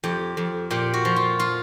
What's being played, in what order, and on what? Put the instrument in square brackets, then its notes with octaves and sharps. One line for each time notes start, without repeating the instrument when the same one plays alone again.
[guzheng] F2 G4
F2
A#2 G4
F#4
F3
F4
F4